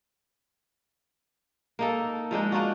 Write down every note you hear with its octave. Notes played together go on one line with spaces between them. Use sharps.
A#3 D#4 A4
F3 G#3 D4 D#4
D4 D#4 F4 F#4